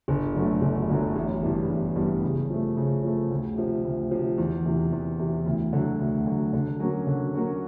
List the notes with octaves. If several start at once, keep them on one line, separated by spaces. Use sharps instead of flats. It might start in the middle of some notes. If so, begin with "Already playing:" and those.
G1
F#2 D3 F#3 A3
G1
F#2 D3 F#3 A3
A1
G2 E3 G3 B3
A1
G2 E3 G3 B3
C#3
F3 A3
C#3
F3 A3
D2
C3 F3
D2
C3 F3
E2
C3 E3
E2
C3 E3
D2
D3 F#3
D2
D3 F#3
D3
F#3 A#3 C#4 F#4
D3
F#3 A#3 C#4 F#4